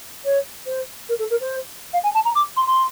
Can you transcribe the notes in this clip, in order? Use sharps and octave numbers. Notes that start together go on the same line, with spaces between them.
C#5
C5
A#4
A4
A#4
C5
F5
G#5
A5
A#5
D6
C6
C6